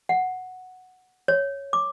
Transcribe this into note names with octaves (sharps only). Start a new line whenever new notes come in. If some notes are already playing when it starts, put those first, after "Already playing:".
F#5
C#5
D6